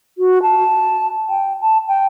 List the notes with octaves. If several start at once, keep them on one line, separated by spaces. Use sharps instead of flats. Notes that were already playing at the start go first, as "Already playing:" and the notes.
F#4
A5
G5
A5
G5